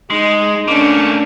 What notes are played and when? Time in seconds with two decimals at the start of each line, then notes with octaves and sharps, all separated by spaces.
0.10 G#3 D#4
0.68 A3 A#3 C#4 D4